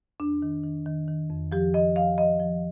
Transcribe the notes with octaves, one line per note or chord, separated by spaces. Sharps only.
F2 D4
D#3
D#3
D#3
D#3
F2
F3 G4
F3 D#5
F3 F5
F3 D#5
F3